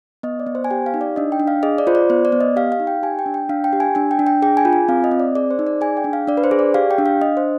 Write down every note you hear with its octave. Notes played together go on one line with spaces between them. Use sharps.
B3 D#5
D5
B3
C5
G#5
G4 G5
F5
D#4
D5
D4 D#5
G5
D4
F5
G#4 D#5
D5
F4 C5
D5
B3 C5
D5
B3
D#5
G4 F5
F5
D#4
G5
G4 G#5
G5
D4
G5
D4 F5
G5
G4
G#5
D4 G#5
G5
D4
G5
G#4 G5
G#5
F4
G#5
C4 F5
D#5
C4
D5
G#4 D5
C5
D#4
D5
G#4 G#5
G5
D4
F5
D4 D5
B4
C5
G#4
D5
G4 F5
G5
D4
F5
D4 D#5
C5